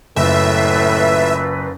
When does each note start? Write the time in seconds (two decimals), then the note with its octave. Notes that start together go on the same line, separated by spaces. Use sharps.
0.16 F#1 A2 F4 B4 E5 E6